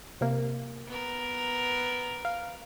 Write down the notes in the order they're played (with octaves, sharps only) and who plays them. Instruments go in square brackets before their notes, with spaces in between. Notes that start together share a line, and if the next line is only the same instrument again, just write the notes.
[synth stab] C3 A#3
[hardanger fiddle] B3 A#4
[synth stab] F5